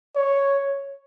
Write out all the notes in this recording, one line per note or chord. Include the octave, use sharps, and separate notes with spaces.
C#5